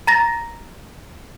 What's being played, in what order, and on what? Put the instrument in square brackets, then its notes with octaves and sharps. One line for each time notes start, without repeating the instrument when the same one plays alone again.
[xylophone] A#5 A6 A#6